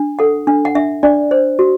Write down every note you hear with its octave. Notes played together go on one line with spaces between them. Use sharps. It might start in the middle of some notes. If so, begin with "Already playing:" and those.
Already playing: D4
A4 F#5
D4
F#5
D4 E5
D4 D5
C5
F#4